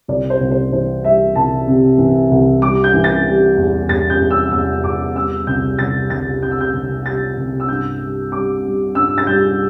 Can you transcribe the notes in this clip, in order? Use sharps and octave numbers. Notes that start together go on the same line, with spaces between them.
C2 D5
C5
C2
C5
E3 C5
G3 E5
C2 A5
C3
E3
C2
G3 D6
G6
E3
A6
G3
E2
E2 A6
G6
E2
E6
E2 E6
E2 D6
G3 E6
C2 G6
C2 A6
C2 A6
C3 G6
E6
G6
C2
G3 A6
C2
E6
G2 G6
G3
G3 D6
G3
G2 E6
A6
G3 G6